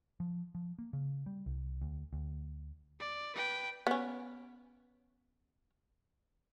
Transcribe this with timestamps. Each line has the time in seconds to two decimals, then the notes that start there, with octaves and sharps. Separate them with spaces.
0.20 F3
0.55 F3
0.79 A#3
0.93 C#3
1.26 G3
1.46 C2
1.82 D2
2.13 D2
3.00 D5
3.35 B4 G5
3.87 B3 C#4